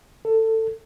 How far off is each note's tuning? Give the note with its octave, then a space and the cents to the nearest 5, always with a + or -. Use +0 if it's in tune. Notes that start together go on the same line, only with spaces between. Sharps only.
A4 +20